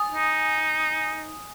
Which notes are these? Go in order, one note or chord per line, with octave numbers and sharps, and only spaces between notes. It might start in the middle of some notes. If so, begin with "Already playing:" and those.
Already playing: G#5 D#6
D#4